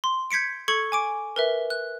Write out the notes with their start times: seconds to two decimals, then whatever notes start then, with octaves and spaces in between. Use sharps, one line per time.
0.04 C6
0.31 G6 G#6 B6 C#7 D7
0.68 A4 C#6 G#6 C#7 F#7
0.92 G#5 D6 D7
1.36 A#4 B4 E5
1.70 F#6